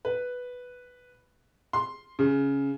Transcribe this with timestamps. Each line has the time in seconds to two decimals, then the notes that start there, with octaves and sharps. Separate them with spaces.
0.05 B4
1.73 C6
2.19 C#3